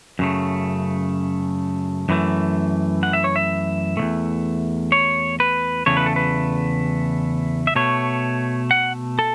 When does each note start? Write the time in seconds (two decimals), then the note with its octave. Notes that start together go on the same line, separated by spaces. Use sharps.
0.19 F#2 C#3 A3
2.09 F#2 E3 A3
3.03 F#5
3.13 E5
3.24 C#5
3.36 E5
3.97 E2 C#3 A3
4.92 C#5
5.40 B4
5.86 E2 C#3 A3 C#5
5.97 B4
6.06 A4
6.16 B4
7.67 E5
7.75 B2 A3 C#5
8.71 F#5
9.19 A4